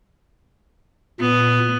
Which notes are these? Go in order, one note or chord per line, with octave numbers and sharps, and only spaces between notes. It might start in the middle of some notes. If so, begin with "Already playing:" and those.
A#2 B3